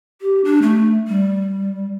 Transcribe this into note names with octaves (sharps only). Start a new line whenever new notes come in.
G4
D4
A3
G3